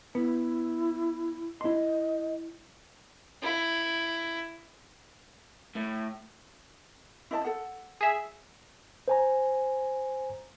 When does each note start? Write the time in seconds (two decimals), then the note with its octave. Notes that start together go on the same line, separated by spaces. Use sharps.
0.15 B3 E4
1.61 E4 D#5 C6
3.43 E4
5.76 A2
7.31 E4 D#5 A5
7.45 A4 F#5
8.01 G#4 E5
9.08 C5 G#5 A#5